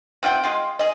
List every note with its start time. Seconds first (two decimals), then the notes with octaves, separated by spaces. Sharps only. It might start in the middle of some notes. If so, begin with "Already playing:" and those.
0.23 C3 F4 F#5 G5
0.43 G#3 F4 G#4
0.79 G#4 D#5